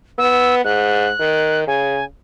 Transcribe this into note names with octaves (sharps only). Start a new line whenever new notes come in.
B3 E6
G#2 F#6
D#3
C#3 G#5